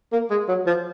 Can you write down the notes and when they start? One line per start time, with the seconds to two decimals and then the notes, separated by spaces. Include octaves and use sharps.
0.12 A#3
0.30 G#3
0.48 F#3
0.66 F3